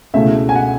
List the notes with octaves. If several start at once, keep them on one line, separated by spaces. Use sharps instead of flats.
C#2 B2 A3 E4 E5
G#5
F#5